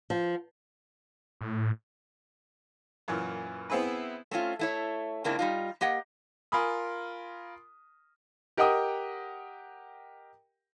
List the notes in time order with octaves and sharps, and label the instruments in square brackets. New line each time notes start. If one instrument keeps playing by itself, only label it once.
[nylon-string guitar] F3
[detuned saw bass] A2
[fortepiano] F#2 A#2 E3
B3 C4 E4 G#4 B4
[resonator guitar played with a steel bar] A3 C4 C#4 F4
A3 E4 C#5
G#2 C#3 A#3 C4 D4 E4
G3 D#4 F4
A#3 G4 D#5 F#5
[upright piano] F4 A#4 G#5 B5 D#6
G4 A#4 D#5 F#5 G5 D#6